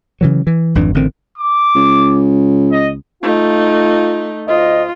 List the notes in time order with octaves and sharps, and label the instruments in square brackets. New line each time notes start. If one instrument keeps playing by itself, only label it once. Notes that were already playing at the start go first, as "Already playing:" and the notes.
[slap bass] C#3 E3 F#3
E3
G#1 F2 E3 D4
A1 D3 D#3 C4
[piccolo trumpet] D6
[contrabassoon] C#2
[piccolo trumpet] D#5
[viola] A3 D#4 [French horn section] F4
[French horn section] D2 C5 D#5 [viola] F4